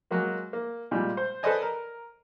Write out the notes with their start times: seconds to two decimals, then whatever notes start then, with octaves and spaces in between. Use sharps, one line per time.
0.11 F#3 G#3 A#3 F#4
0.53 A#3
0.91 A#2 G3 G#3
1.17 C5
1.43 A4 B4 C5 D5 D#5 G#5
1.62 A#4